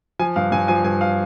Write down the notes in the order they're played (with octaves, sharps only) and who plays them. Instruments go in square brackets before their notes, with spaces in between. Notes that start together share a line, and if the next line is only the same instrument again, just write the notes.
[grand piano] F3 G#5
G2 F5
G2 G#5
F3 G#5
G2 G#5
F5